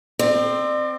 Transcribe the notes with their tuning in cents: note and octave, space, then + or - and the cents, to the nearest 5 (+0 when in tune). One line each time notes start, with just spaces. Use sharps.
C4 +0 D5 +40